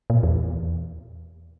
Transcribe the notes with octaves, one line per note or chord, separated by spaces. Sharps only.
A#2
E2